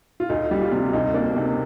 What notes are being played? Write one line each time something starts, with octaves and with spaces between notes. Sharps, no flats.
F4
D2 D#4
G3
F4
C3
D2 D#4
A#3 D4
C3 D#4